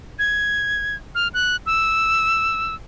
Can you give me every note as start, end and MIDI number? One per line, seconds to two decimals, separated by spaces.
0.19 0.96 92
1.15 1.28 89
1.34 1.56 90
1.66 2.75 88